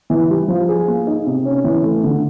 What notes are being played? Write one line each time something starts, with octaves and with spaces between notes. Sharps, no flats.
E3
G3
F3
G#4
A#3
D#4
C3
C#4
E3
A3
D3